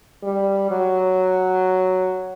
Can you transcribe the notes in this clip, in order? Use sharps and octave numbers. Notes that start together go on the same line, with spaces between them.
G3
F#3